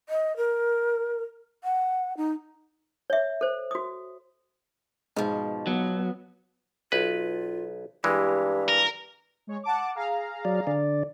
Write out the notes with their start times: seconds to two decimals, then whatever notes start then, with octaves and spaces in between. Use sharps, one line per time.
0.09 D#5
0.37 A#4
1.64 F#5
2.17 D#4
3.10 C#5 E5
3.41 A4 C5
3.71 F#4 D#6
5.17 G#2 B2 F3
5.67 F#3 B3
6.92 B1 F4 B4
8.04 G2 E3 G#3 G4
8.69 A#4
9.47 G#3 C#5
9.64 F#5 A5 D6
9.95 G#4 F5 A#5
10.45 F#3 D5
10.67 D3 D5